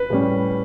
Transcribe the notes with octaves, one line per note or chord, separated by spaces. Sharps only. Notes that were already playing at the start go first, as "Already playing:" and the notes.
Already playing: B4
A2 G3 C#4